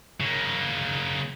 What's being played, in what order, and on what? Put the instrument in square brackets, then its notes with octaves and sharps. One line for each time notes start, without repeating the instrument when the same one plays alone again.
[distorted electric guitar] C#3 A#3